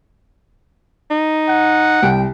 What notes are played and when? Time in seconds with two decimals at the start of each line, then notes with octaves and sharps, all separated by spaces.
1.11 D#4
1.48 F#5
2.03 C2 G5